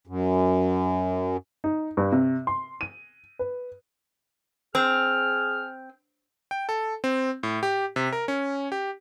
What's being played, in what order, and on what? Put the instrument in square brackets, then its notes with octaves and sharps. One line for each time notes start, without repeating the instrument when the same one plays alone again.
[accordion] F#2
[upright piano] D#4
G2
C3
C6
D#7
B4
[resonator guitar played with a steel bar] C4 [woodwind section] G#4 F6
[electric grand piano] G5
A4
C4
A2
G4
C3
A#4
C#4
G4